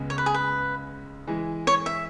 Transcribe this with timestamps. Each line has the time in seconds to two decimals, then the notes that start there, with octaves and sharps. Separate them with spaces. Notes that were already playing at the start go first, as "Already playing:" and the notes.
Already playing: C#2 C#3 G#3 B3
0.10 C#5
0.18 B4
0.26 G#4
0.34 B4
1.27 E3 G#3 E4
1.67 C#5
1.86 E5